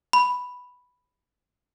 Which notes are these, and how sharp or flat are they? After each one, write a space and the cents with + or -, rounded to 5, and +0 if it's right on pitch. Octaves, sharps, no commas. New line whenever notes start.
B5 +0